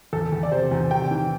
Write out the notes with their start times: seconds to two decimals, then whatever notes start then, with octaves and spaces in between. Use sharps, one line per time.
0.13 E2 A4
0.32 E2
0.43 D5
0.52 C3 C5
0.71 E2
0.91 C3 G5
1.11 E3